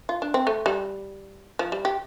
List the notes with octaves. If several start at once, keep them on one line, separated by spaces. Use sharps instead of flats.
F4
D4
C4
A3
G3
F3
G3
G4